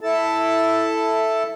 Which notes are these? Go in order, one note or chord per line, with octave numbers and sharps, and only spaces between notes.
E4 A4 A5